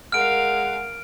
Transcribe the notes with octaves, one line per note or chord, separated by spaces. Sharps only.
G#3 A#4 F5 F#5 F6 D7